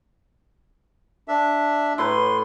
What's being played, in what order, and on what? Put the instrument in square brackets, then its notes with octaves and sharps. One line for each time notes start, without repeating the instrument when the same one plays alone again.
[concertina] D4 E5
[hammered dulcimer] A2 B4 A#5 [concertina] C6